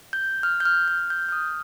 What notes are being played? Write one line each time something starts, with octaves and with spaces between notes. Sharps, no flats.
G6
F6
G6
F6
F6
G6
F6
D#6